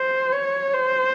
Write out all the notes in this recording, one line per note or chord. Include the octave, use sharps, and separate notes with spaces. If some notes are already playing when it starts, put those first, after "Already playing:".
Already playing: C5
C#5
C5